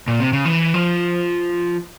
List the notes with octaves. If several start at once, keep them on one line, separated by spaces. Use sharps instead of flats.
A#2
C3
C#3
E3
F3